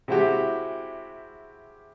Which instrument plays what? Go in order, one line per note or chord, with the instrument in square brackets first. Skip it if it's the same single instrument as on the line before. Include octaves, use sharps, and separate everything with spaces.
[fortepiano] C3 G#3 E4 F#4 G4